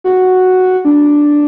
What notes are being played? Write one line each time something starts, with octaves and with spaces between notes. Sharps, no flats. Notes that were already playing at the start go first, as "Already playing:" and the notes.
F#4
D4